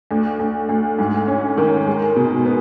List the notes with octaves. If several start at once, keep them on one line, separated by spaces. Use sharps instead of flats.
D2
D2
D2
G#2
C#4
D#3
G#3
B2
B3